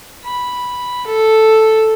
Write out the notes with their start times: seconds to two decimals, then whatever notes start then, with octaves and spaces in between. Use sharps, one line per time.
0.25 B5
1.07 A4